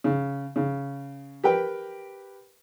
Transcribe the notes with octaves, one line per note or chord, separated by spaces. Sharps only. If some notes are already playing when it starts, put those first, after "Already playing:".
C#3
C#3
G4 A#4 B4 G5